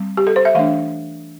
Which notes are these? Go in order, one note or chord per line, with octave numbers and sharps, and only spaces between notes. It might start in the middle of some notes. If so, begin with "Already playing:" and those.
Already playing: G3 C4
G4
A4
C5
E5
E3 A3 D4 F5